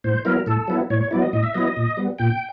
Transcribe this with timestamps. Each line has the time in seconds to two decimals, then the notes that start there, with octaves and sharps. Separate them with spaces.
0.04 A2 C5
0.25 F#3 B3 E4 A#4
0.46 A2 A4
0.68 F#3 B3 E4
0.90 A2 C#5
1.01 C#5
1.11 F#3 B3 E4 D5
1.22 D#5
1.33 A2 D#5
1.43 E5
1.54 F#3 B3 E4 D#5
1.77 A#2
1.97 G3 B3
2.18 A#2 G5